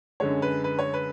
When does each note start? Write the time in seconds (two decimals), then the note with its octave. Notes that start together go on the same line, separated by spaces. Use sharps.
0.20 F#2 D3 G#3 C#5
0.42 B4
0.64 B4
0.79 C#5
0.94 B4